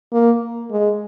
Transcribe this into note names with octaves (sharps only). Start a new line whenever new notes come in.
A#3
G#3